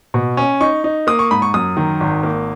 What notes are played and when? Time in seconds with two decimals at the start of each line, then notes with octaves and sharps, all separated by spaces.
0.14 B2
0.37 C#4
0.61 D#4 C#6
0.84 D#4
1.07 A#3 D#6
1.19 C#6
1.31 G#2 B5
1.42 C#6
1.54 F#2 D#6
1.77 D#3
2.00 G#1
2.23 A#3